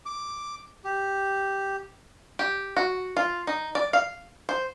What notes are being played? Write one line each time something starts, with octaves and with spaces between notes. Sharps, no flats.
D6
G4
G4
F#4
F4
D#4
D5
F5
C5